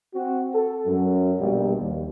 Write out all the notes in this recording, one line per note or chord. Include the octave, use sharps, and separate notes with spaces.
C4 F#4
A4
F#2 F#3
A#1 B2 G3
D#2